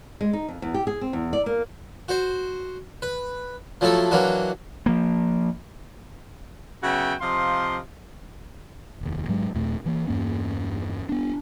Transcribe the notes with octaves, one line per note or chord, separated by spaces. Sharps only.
G#3
D#4
F2
E2
G4
G#4
C4
E2
D5
A#3
F#4 C5
B4
F3 F#3 A3 E4 A4
E3 F#3 A#3 D4 F#4
F3 A#3
C#3 F#3 B3 F#4 E5 G5
C3 F3 D#5 F5 C6
F1 D#2
G#2 F#3 G#3
D#2 A#2 A3
E3 A#3
E2 G2 A#3 C#4
B3 D4